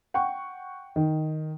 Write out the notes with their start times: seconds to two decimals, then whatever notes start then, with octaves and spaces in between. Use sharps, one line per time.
0.14 F#5 G5 C#6
0.96 D#3